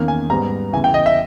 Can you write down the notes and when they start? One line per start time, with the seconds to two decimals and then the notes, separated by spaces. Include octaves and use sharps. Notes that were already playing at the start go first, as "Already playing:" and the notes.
Already playing: E2 D#3 A#3 C#4
0.08 G#5
0.30 G#2 G3 B3 A#5
0.73 E2 C#3 E3 G#5
0.84 G5
0.94 D#5
1.06 E5